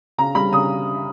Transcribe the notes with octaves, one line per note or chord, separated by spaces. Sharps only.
C#3 A#5
G3 B5
C#3 D#6